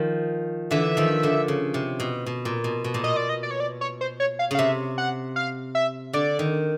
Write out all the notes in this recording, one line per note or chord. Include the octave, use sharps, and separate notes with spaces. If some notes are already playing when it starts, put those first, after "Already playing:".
Already playing: D#3 F3
D3 E3 E5
D#3 F3
D3
C#3
C3
B2
B2
A#2
B2
B2
A#2
B2 D#5
D5
D#5
D5
C#5
D5
C#5
C5
C#5
F5
C#3 F5
C3 E5
F#5
F5
E5
D3 D5
D#3